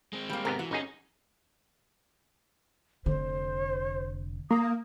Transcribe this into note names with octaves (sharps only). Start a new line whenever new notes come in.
G#3 C4
G3 A#3
G#2 C3 B3 A#4
E3 F#4
G1 C#4 D#4 G#4
F1 D3 C5
A#3 D#6